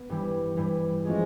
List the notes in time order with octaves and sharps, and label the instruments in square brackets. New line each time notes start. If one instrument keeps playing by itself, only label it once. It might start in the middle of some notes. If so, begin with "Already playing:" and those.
Already playing: [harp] B3
G2 E3 G3
G2 E3 G3
[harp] F3 A3 C#4 F4 G#4 [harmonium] G#3